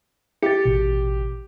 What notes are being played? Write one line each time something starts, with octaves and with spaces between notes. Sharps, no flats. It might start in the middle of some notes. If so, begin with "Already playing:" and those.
G4 A6 C#7
A1 B2